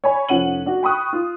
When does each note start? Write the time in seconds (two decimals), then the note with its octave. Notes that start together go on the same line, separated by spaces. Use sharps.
0.04 C#5 D5 G#5 B5
0.29 F1 F3 C#4 F#5 D#7 F#7
0.66 D4 F#4
0.83 G5 B5 C#6 D#6 F#6
1.13 F4